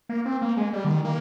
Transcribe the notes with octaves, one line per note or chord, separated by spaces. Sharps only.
A#3
C4
A#3
G#3
G3
D3
D#3
A#3